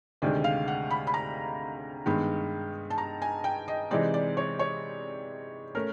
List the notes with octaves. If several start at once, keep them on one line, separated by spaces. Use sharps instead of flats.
D2 C3 D#3 G#3 D5
F5
F#5
B5
B5
A#5
G2 D#3 G#3 B3
A5
A#5
G#5
G5
D#5
C3 E3 G#3 C4 D#4 D5
D5
C#5
C#5
A3 C#4 A#4